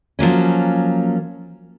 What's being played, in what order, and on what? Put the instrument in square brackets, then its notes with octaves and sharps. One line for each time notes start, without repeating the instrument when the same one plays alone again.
[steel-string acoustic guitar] F3 F#3 A#3 C#4